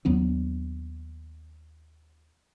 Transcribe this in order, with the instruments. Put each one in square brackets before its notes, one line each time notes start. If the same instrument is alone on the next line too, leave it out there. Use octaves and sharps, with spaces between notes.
[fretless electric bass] D#2 F#3 B3 D4